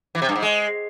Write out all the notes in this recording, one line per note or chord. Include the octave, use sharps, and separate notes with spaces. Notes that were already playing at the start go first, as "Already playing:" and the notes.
E3
C3
G2
G#2
G#3